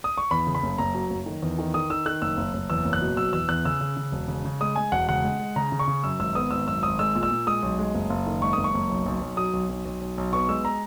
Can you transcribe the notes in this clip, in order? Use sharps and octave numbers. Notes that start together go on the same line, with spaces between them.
D#6
C#6
E2 B5
C#3
B5
F#1
F#1 A#5
F#3
F#1
D#3
E2
D#3
D#3 D#6
D#3 E6
D#3 F#6
F#1 E6
F#1
F#1
E2 E6
F#1
F#6
B2
F#3 E6
E2 E6
E2 F#6
C#3 E6
C#3
C#3
E1
C#3
C#3
G#3 D#6
G#3 G#5
E1 F#5
C#3 F#5
G#3
G#3
C#3 A#5
C#3
C#6
C#3
F#2 E6
G#1 E6
B3 D#6
G#1 E6
F#2 E6
G#1 D#6
G#3 E6
A#2
E6
A#2
G#3 D#6
B1
G#3
F#1
F#1
D#3
G#3 C#6
F#1 D#6
C#6
F#1
B1
B1
B1
F#3 D#6
B1
B1
B1
B1
B1
B3 C#6
G#3 E6
A#5